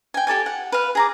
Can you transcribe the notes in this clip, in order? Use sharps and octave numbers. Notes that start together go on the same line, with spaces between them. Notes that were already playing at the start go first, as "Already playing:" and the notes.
G5 G#5
G4 A4 D5 G#5
F#5
B4 F5
G#4 A#5 D6